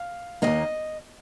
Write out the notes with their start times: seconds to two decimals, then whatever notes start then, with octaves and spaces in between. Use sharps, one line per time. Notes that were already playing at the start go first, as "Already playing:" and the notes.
Already playing: F5
0.42 D#3 A#3 D#5
0.47 D#2